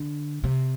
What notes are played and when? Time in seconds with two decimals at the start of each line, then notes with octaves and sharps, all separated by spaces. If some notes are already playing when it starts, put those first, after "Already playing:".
Already playing: D3
0.44 C3